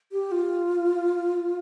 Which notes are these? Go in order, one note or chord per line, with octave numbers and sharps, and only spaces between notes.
G4
F4